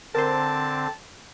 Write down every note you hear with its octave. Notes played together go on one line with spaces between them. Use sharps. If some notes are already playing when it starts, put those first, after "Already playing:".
D3 C4 A#4 C5 A5